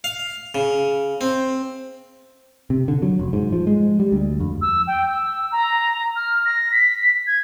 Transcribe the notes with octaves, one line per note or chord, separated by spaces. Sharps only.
F5
C#3
C4
C3
D3
F#3
F1
G#2
F3
G#3
G3
D2
F2
E6
G5
E6
A#5
F6
A#6
B6
G#6